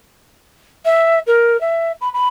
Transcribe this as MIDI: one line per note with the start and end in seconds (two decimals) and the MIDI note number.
0.85 1.19 76
1.27 1.59 70
1.60 1.92 76
2.01 2.09 83
2.13 2.28 83